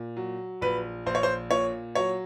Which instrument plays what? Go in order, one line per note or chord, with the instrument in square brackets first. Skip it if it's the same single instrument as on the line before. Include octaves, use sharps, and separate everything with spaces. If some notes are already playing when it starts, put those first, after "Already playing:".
Already playing: [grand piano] A#2
F#3
A#1 B4
A#1 C5
C#5
C5
A#2 C#5
F#3 C#5